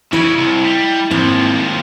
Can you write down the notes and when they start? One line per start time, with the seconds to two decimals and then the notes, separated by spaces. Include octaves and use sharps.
0.13 C#3 E4 D#5
0.38 C2
0.65 G3
1.11 D#2 G#2 F3 C4 E4